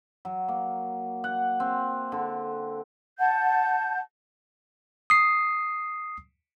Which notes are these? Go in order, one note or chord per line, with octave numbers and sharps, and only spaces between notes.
F#3
A#3
F#5
C4
D3
F#5 A5 G6
D#6 C7